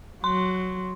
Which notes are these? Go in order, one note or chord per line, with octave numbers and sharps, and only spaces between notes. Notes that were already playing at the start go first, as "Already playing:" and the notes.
F#3 C6